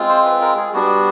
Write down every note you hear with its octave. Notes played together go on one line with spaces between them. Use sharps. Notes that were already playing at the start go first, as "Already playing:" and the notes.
Already playing: G#3 C4 F4
C5
B4
A#4
G#4
G3 B3 D4 F#4